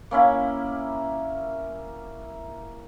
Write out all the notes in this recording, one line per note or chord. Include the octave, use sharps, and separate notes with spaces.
A#3 C#4 E4 B5